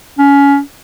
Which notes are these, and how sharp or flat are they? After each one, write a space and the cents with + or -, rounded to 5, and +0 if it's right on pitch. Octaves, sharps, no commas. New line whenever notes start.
C#4 +20